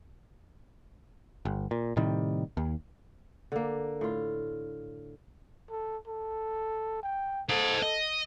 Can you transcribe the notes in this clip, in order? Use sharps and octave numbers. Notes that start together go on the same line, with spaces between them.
G1
A#2
A2 C3 D#3 G3
D#2
D3 A#3
A2 F4
A4
A4
G5
A4 C5 D#5
D#5